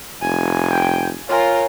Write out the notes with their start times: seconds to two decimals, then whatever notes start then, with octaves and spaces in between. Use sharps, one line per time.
0.21 F1 G#5
0.71 G5
1.29 F4 A#4 C#5 G#5